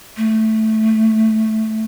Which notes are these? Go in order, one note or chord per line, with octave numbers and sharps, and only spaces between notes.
A3